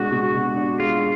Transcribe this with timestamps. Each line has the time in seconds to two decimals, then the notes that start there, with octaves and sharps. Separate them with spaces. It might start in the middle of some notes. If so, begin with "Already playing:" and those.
Already playing: B2 G#3 D4 F#4
0.11 B2
0.34 B2
0.56 D4
0.79 G#3 F4